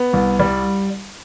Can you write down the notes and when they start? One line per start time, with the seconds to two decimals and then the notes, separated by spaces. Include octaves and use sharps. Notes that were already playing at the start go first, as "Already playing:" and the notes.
Already playing: B3
0.13 C2
0.40 G3